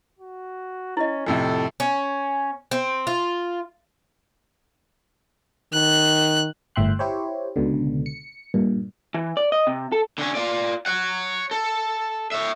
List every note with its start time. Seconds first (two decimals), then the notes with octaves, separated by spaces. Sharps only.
0.19 F#4
0.97 C#4 E4 D#5
1.26 F2 A2 C3 A4
1.80 C#4
2.71 C4
3.07 F4
5.73 D#3 F#6
6.76 G1 A2 E5 G5 C6 F#6
6.99 E4 G4 C5 C#5
7.56 C#2 B2 D3
8.06 C#7
8.54 G2 A#2
9.14 E3
9.37 D5
9.52 D#5
9.67 C3
9.92 A4
10.18 D3 C#4
10.35 F4 D5
10.86 C#5 F#5
11.51 A4
12.32 C#5 E5